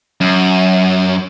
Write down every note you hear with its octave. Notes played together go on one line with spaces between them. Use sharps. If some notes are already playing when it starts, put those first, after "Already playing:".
F#2